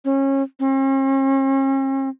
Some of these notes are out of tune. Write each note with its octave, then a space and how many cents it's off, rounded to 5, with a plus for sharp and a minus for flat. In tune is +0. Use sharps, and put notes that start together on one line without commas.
C#4 -25
C#4 -45